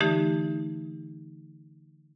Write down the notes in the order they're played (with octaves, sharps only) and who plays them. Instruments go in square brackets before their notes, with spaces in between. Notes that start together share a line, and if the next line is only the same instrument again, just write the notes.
[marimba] D3 E3 A3 D#4 G4